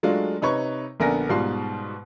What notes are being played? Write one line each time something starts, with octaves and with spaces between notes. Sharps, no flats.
F#3 G#3 A3 D4 F4
C3 D#4 B4 C#5 C#6
A#1 D3 B3 A#4 G#5 A#6
G#2 B2 G3 F4 C6 C7